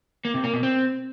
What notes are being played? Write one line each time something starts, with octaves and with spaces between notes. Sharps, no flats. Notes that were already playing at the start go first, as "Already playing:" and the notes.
A#3
C3
A#3
B2
C4